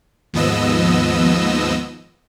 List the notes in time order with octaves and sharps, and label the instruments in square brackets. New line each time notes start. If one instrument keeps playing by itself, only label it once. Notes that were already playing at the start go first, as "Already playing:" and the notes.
[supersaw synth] D#2 G#2 F3 B3 D#5 E6